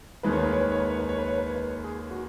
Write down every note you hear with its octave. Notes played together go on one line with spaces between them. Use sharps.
D#2 D#3 G#3 B4
C#5
B4
C#5
B4
C#5
B4
C#5
B4
C#5
B4
C#5
B4
C#5
B4
G#4
F#4